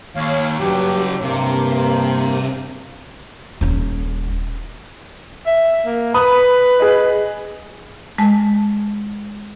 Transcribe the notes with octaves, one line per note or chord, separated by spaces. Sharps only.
D#2 C#5 F5
G2 C#3 F#3 G4
G2 C3 A#3
D#1 C#4
E5
A#3
B4 B5 D#6
G#4 D#5
G#3 A5